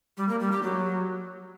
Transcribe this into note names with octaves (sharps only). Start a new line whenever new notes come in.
G3
A#3
G3
G4
F#3